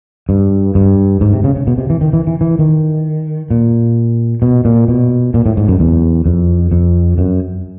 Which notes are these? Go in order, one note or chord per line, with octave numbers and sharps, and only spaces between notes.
G2
G2
G#2
C3
C#3
C#3
B2
C3
E3
D#3
E3
E3
E3
D#3
A#2
B2
A#2
B2
A#2
A2
G#2
F#2
E2
F2
F2
F#2